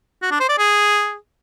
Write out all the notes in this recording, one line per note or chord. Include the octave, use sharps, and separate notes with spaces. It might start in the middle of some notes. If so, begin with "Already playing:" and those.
F#4
D4
C5
D5
G#4